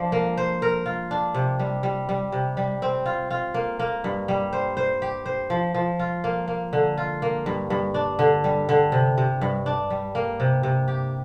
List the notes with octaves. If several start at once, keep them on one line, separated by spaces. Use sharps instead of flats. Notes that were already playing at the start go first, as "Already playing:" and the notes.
Already playing: F3 D4
A#3
C5
A#4
F4
D4
C3
G3
G3
G3
C3
G3
C4
F4
F4
A#3
A#3
G2
G3
C5
C5
G4
C5
F3
F3
F4
A#3
A#3
D3
F4
A#3
G2
G2
D4
D3
G3
D3
C3
C3
G2
D4
G3
A#3
C3
C3
G4